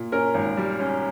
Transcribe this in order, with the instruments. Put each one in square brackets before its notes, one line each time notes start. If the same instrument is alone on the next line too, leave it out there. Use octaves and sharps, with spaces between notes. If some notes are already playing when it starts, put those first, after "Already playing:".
Already playing: [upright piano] A#2
C#4 A#4
G#1
G3
C#4